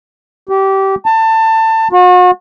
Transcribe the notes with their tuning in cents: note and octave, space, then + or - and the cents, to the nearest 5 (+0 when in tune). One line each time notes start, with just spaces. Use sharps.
G4 -20
A5 +25
F#4 -40